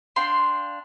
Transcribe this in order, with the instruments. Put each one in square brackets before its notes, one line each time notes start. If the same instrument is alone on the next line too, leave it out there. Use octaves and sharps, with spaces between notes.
[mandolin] D4 F5 G5 C6